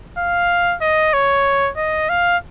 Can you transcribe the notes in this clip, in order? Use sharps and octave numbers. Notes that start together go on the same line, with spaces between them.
F5
D#5
C#5
D#5
F5